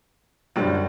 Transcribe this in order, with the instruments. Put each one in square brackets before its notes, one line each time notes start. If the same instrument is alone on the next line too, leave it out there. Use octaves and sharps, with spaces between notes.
[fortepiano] C2 D3 G3 [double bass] F#2